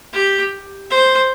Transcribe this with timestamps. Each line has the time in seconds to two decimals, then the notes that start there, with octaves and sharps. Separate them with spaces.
0.13 G4
0.90 C5